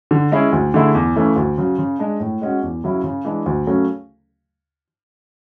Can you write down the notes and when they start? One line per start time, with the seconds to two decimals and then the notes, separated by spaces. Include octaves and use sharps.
0.11 D3
0.32 G#3 C#4 E4 G#4
0.52 D2
0.74 D3 A3 E4 G#4
0.95 E2
1.16 C#3 E3 A3 C#4
1.36 D2
1.58 C#3 F#3
1.78 C#3
1.99 G#3 D4
2.20 A2
2.42 G#3 C#4 F#4
2.62 E2
2.84 C#3 F#3 C#4 E4
3.04 C#3
3.25 E3 G#3 D4
3.46 D2
3.67 C#3 F#3 A3 C#4